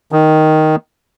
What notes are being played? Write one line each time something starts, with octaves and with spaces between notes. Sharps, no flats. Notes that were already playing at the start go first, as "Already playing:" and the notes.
D#3